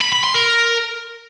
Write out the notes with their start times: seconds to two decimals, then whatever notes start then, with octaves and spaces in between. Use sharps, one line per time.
0.02 B5
0.13 B5
0.24 C6
0.35 A#4